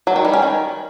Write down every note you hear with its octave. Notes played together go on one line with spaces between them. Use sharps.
F#3
D#3
G3
C#4
D#3